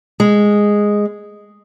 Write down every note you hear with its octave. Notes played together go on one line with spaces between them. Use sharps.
G#3